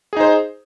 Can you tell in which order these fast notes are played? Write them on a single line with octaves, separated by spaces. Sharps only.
G#4 D#4 C5